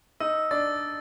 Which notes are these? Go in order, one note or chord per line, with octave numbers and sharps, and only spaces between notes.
D#4 D#5 E6
D4 D5 A6